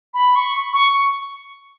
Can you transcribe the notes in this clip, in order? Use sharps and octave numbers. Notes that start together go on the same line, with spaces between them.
B5
C#6
C#6